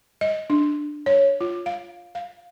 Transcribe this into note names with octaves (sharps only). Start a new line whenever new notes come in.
D#5
D4
C#5
F4
F5
F5